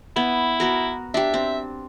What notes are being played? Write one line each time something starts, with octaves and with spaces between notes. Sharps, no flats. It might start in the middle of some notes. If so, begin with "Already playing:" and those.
B3 E4
B3 F#4 A#4
D4 G4 E5
C4